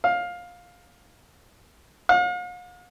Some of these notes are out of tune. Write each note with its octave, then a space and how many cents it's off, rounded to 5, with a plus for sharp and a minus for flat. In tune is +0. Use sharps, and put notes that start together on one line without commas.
F5 +15
F5 +45